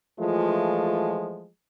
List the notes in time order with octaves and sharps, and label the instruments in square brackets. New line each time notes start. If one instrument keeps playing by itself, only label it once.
[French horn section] E3 F3 G#3 A3 F4